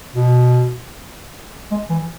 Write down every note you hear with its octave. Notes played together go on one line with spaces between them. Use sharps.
B2
G#3
E3